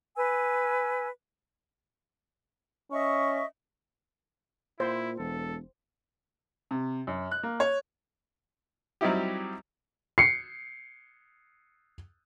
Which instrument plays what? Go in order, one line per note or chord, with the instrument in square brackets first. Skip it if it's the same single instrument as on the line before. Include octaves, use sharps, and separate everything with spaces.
[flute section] B4 G#5 E6
[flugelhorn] C#4 [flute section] D#5 E5 C#6
[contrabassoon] A#2 [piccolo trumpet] E4 [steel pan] C5
[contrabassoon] E1 [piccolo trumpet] A4
[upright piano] C3
F#2
F#6
A#3
C#5
[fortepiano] F#3 G3 C4 D#4 E4 G4
[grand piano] C7 C#7